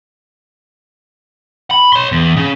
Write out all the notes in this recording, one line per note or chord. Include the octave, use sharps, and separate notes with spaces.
B5
C#5 C6
E2
C#3